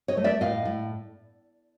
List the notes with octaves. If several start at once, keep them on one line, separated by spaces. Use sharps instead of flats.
C#5 D#5
A3
D5 E5
A2 D#5 F5
A2